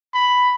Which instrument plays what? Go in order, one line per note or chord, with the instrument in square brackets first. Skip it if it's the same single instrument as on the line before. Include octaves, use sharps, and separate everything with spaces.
[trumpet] B5